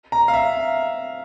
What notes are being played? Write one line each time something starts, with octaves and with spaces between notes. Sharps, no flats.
A#5
F5
E5